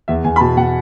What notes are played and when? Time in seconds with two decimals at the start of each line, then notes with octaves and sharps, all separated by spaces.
0.08 E2 E5
0.24 E2 G#5
0.36 B5
0.40 B2 A5
0.57 B2 F#5